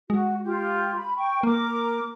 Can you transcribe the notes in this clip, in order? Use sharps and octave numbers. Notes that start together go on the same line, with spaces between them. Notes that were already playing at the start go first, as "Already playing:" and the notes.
G#3 F#4
F4 G4
B5
G5 C#6
A#3 A#4 D6